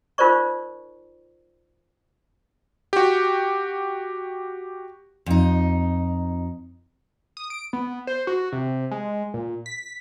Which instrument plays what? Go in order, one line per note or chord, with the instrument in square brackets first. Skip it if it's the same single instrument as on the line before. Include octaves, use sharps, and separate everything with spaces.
[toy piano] D#4 F4 A#4 C5 D5 C#6
[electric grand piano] F#4 G4
[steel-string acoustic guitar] F2 D#4
[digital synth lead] D#6
D7
B3
C5
F#4
C3
G#3
A#2
B6